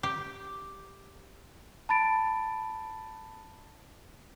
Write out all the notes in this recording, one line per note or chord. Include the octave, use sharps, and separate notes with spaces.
G4
A5 B5 A6 D7